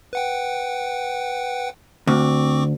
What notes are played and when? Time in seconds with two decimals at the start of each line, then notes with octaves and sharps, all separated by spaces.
0.13 B4 F#5 G5
2.07 D2 C4 C#6 D6